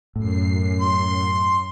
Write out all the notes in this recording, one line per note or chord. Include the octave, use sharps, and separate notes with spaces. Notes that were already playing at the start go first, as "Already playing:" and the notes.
F#2 A2 C7
C6